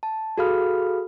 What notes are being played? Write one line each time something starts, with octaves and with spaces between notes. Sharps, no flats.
A5
F#4 G#4 A4 F5 B5 F6